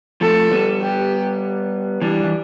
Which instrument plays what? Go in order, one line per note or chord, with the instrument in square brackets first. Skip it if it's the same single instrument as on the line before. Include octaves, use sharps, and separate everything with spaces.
[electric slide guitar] F3 A3 [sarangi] A4
[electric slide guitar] G3 B3
[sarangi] G4
[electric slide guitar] E3 G3 [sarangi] D4
[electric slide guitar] E3